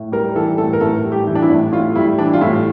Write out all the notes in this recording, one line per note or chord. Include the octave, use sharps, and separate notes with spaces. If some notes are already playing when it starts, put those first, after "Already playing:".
Already playing: A2
G3 A#4
E3 A4
A2 A4
A#4
A2 A4
G3
G4
E3
D4
E4
A2
A2 F4
G3 E4
E3 D4
F4
A2 E4